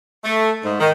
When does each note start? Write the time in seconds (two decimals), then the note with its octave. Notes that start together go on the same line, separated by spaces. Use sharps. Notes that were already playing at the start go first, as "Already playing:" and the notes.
0.23 A3
0.63 G#2
0.80 D#3